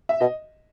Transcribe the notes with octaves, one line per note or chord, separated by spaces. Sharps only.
E5
B2 D#5